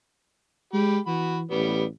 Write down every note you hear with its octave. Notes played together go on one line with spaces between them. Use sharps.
G#3 G4 B5
E3 F#4 B5
A1 G3 B3